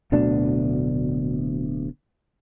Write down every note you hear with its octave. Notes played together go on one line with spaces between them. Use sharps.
D1 D2 B2 D4